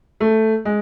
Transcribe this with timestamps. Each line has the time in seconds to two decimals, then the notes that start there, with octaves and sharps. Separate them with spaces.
0.21 A3
0.65 G#3